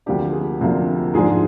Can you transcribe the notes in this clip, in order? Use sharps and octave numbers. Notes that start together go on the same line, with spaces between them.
D2 C3 F3 A#3 D4 G4
G#4
D2 C3 F3 A#3 D4
G#2 F3 G#3 D4 G#4